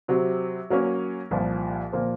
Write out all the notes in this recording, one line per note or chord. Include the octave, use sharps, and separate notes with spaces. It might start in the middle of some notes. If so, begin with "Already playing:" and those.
C3 F#3 C4
F#3 A#3 C#4
C2 A#2 F3
A#2 F3 A#3 F4 C5